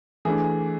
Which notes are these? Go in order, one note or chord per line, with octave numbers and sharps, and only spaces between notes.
E3 A3 D4 G#4